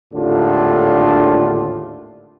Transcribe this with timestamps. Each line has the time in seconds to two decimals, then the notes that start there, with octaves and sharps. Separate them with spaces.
0.13 G#1 D#2 A2 D3 D4 F4